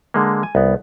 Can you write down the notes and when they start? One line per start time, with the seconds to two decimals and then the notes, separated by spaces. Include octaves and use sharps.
0.14 D3 G#3 A#3
0.43 G#5
0.55 C2 B3